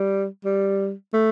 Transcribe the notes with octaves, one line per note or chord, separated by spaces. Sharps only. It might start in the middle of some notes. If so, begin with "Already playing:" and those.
Already playing: G3
G3
A3